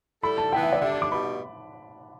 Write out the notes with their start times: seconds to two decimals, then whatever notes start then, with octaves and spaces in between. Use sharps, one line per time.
0.23 G3 E4 A4 B5
0.38 A5
0.53 E3 B3 E4 G5
0.63 E5
0.73 D5
0.82 D3 G3 D4 E5
0.92 A5
1.02 D6
1.12 B2 G3 B5